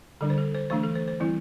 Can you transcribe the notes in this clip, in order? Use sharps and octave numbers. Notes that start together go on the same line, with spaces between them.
D3 G3 D4 A4
C5
A4
C5
E3 A3 D4 C5
A4
C5
C5
E3 G3 C4 E4